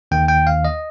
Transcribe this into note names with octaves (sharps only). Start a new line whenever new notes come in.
D#2 D#3 G5
G5
F5
D#5